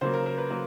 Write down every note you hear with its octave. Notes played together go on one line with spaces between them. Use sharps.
C#3 F#3 A#3 C5
A#4
A#4
B4
F#3 A#3